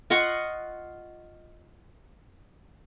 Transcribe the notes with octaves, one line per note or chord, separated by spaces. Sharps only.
F4 D#5 F#5 C#6